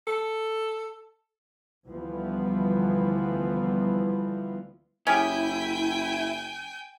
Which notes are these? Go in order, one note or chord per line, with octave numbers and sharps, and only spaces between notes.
A4
D2 E3 F3 G3 B3
F#1 C#4 E4 G4 G#4 G5 G#5 G6